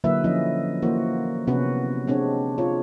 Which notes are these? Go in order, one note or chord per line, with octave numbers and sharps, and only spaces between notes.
D3 F#3 A#3 E4 B4 E5
F3 C#4 E4 D#5
E3 A#3 F#4 C5
C3 B3 C#4 F#4 B4
G#3 C4 D4 C#5
D#4 F4 C#5